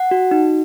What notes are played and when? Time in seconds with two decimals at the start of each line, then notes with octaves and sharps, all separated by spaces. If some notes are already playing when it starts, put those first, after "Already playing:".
Already playing: F#5
0.11 F#4
0.31 D#4